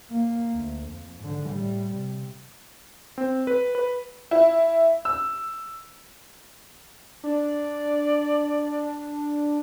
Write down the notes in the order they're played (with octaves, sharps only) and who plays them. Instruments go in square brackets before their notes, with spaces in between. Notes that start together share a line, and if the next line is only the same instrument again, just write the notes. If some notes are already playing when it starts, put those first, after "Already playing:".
[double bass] A#3
D2
F2
G#2 D3
A2 G3
C3
[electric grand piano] C4
B4
B4
[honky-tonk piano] E4
E6
[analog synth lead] D4 [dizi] D5